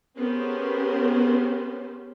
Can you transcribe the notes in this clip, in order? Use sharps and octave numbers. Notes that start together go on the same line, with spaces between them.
B3 C#4 G4 G#4 A#4 C5